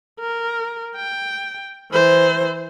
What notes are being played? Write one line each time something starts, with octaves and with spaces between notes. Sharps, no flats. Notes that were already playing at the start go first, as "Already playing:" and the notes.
A#4
G5
E3 C5